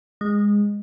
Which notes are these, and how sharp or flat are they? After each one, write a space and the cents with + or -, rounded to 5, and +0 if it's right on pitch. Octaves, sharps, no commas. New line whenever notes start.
G#3 -15